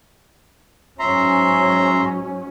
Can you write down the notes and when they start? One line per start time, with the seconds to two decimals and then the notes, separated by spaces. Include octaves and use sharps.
0.99 G#2 F#3 C#4 E5 A#5 C6